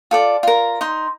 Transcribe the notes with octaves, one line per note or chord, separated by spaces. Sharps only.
F4 A4 D5
F4 A#4
D#4 C6